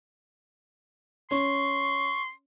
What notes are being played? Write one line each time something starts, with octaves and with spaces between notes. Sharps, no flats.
C#4 C6 C#6